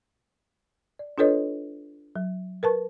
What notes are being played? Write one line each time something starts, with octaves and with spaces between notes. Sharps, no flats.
D5
D4 F4 A4 B4 C#5 D#5
F#3
A#4 B4 A5 C#6